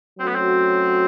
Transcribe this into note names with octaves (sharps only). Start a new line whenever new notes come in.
F#3 A3 C4 C#4 F#4
B3
C4